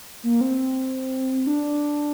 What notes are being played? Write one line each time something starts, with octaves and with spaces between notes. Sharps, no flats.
A#3
C4
D4